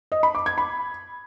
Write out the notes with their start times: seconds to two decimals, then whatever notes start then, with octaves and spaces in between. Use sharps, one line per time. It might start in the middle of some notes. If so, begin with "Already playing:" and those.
0.12 D#5
0.23 B5
0.35 D6
0.46 G#6
0.58 B5